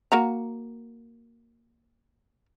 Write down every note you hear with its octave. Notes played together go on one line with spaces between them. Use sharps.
A#3 F#4 A#5